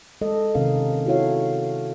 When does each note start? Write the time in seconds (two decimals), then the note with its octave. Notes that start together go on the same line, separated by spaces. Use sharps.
0.21 G#3 A4 D#5
0.55 C3 D#3 C#4 A#4 F5
1.06 E4 F#4 A4 C#5 F5